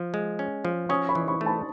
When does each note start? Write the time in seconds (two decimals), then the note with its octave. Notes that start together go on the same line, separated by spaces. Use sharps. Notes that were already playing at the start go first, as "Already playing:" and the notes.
Already playing: F3
0.14 G#3
0.39 C#4
0.65 F3
0.89 C#4 C#6 D#6
1.09 B5 C#6
1.15 E3
1.28 B5 C#6
1.41 A3
1.46 A5 B5